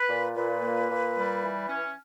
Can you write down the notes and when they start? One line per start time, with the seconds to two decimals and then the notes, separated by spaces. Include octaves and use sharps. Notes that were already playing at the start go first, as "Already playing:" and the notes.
Already playing: B4
0.09 A#2
0.35 A#2 B4
0.62 A#3
0.89 A#2
1.16 G3
1.42 E3
1.68 C#4